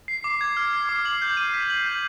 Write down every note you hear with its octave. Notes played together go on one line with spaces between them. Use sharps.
C7
D6
G#6
F6
C7
D6
F#7
G6
D#7
B6
F#7
G6